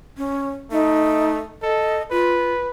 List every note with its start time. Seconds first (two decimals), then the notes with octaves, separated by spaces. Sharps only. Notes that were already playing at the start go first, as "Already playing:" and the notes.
0.17 C#4
0.72 A3 D#4
1.63 A4 D#5
2.11 F4 B4